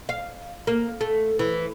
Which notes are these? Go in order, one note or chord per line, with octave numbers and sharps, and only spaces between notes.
F5
A#3
A3
E3